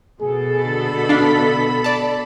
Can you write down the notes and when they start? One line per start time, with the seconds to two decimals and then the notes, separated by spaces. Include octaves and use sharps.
0.21 B2 G#4 A4
0.65 D3 B5
1.09 D4 F5
1.84 D5 A5